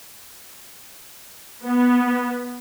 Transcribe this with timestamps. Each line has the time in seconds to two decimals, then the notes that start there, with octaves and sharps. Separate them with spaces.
1.64 B3